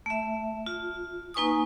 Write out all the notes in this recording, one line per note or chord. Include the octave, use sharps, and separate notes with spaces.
A3 E5
F4
A#3 D#4 B4 G#5 C#6 D#6